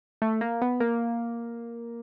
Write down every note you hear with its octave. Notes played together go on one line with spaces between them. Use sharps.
A3
A#3
B3
A#3